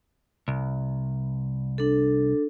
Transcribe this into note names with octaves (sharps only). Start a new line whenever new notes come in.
C2
D4 A4